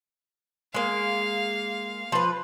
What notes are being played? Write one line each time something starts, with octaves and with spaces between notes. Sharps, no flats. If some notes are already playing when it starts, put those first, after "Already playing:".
G#3 A#3 F5
F3 B4